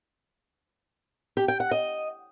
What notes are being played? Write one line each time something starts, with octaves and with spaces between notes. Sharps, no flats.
G4
G5
F#5
D#5